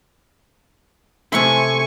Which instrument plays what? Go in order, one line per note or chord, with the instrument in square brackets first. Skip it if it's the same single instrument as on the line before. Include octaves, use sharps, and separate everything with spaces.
[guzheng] C3 A3 E4 [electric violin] G#5 C#6